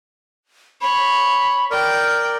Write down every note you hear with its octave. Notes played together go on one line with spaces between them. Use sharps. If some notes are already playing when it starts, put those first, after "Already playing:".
C#5 B5
A#4 D5 G5 F6